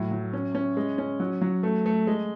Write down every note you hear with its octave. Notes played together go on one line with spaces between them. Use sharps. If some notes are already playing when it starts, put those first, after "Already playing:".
Already playing: A2 F#3
F#3
C#4
C#4
G#3
C#4
F#3
F#3
A3
A3
G#3